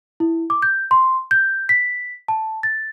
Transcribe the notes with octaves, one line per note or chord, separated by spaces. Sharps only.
E4
D6
G6
C6
G6
B6
A5
A6